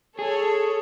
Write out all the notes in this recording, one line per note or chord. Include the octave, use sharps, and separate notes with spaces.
G#4 A4 C#5